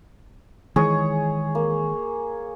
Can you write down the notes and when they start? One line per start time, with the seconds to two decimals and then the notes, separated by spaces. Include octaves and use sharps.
0.76 D#3 E3 G#3 G#4 C#5
1.55 A#3